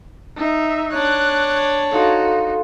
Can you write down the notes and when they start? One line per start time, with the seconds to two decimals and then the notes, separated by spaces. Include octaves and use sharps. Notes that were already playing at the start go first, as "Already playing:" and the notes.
0.36 D#4 E5
0.92 D4 C#5 F#6
1.91 D#4 F#4 A4 F5 C6